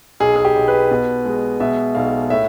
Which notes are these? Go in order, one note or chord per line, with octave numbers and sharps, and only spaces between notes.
B1 G#4
G#4
G4
B1
B4
B2
G#3
B2 E5
B1 F5
A2 E5